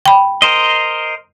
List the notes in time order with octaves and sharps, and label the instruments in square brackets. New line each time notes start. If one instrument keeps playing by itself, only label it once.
[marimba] G5 B5
[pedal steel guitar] A#4 C5 D#5